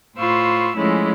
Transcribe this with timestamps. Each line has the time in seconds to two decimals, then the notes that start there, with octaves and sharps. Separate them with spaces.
0.16 A2 F4 C5 B5 C#6 E6
0.75 F3 G#3 A3 C#4 E4